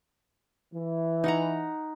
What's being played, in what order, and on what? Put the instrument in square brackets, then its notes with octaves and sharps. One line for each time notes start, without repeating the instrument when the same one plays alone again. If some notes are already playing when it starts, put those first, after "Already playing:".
[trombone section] E3
[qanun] D#4 F#5 A#5